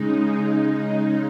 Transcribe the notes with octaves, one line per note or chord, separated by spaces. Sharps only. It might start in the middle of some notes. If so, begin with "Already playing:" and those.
Already playing: C#3 G#3 D#4